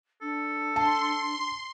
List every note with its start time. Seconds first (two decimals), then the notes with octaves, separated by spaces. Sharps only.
0.22 D4 A4
0.76 A5 C6